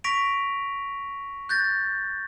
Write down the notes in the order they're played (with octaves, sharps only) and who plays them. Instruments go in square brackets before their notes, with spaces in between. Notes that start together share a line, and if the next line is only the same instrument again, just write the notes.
[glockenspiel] C#6 A#6 B6 D7 F7
F#6 G6 A6 A#6